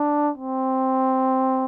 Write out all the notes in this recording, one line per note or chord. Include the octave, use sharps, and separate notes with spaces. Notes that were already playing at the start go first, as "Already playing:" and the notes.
Already playing: D4
C4